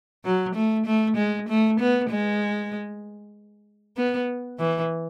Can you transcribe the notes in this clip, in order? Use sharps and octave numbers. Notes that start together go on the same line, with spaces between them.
F#3
A3
A3
G#3
A3
B3
G#3
B3
E3